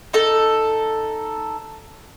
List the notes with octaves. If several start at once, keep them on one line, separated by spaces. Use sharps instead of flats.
D#4 A4